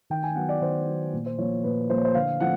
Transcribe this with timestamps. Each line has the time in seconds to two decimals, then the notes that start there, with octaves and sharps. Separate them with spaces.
0.10 D#3 G5
0.23 G#5
0.35 F#3 B3 F#5
0.49 D5
0.61 D#3 C5
0.87 F#3 B3
1.13 A#2
1.26 C5
1.38 F3 A#3 C#5
1.64 A#2 B4
1.89 F3 C5
1.93 A#3 C#5
2.05 C5
2.15 D3 F5
2.40 F3 A3 C4 F#5